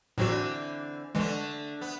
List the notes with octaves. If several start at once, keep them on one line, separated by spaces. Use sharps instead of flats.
A2 D3 E3 F#3 C4 F#4
D3 E3 G#3 A3
B3